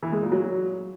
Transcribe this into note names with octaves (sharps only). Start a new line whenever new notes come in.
E3
G#3
A#2
F#3